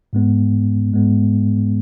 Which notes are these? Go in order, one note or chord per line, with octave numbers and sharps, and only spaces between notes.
G#2 G#3 B3
G#2 G#3 B3